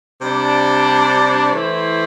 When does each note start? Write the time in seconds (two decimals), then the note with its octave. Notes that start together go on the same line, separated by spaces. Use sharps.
0.21 C3 G3 D4 C5
1.51 E3 A3 E4 C5